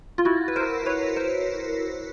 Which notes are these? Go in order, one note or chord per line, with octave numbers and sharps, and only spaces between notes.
F4
E4 F#4
B4
A#4 C5
B4 C#5
A#4 C5